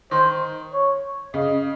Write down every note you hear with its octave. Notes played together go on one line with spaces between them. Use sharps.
D#3 C5
C#5
C#3 D#5